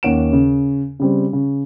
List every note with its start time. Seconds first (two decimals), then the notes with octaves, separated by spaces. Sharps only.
0.03 D#2 C#4 F#5 D7 E7
0.33 C#3
1.00 C#3 G3 C4
1.33 C#3